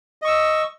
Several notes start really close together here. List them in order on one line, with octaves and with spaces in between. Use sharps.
D#5 C#6 E6